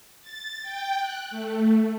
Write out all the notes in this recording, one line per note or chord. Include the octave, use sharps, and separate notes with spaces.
A6
G5
F#6
A3